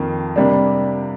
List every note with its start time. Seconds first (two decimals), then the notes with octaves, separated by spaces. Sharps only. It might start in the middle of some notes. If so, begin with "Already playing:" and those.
Already playing: F2 D#3 A#3
0.36 C3 G3 A#3 D4